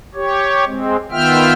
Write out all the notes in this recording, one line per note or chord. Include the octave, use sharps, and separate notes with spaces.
G4 C#5
G#3 C4
D#3 B3 F4 E5 G5 F6